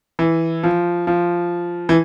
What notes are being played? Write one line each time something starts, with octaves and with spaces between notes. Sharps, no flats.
E3
F3
F3
E3